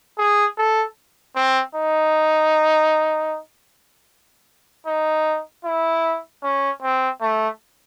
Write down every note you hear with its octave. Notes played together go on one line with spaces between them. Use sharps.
G#4
A4
C4
D#4
D#4
E4
C#4
C4
A3